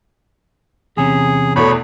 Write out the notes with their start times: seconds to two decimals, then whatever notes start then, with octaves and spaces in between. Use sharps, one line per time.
0.97 E2 C3 C#4 G#4
1.56 E2 B2 A3 C#5 B5